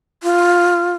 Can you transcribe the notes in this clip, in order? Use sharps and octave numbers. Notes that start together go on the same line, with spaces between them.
F4